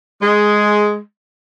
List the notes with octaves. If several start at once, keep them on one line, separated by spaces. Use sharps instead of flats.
G#3